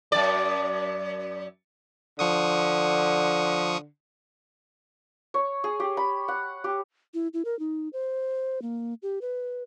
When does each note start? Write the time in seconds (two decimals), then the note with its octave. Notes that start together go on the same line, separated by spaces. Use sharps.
0.12 F#2 D5
2.19 D3 F3 C#6 D#6
5.34 C#5
5.64 G#4
5.80 G4
5.97 B5
6.28 F#5
6.64 G4
7.14 E4
7.34 E4
7.45 A#4
7.59 D#4
7.93 C5
8.62 A#3
9.02 G4
9.22 B4